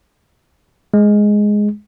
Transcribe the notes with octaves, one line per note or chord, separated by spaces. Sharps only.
G#3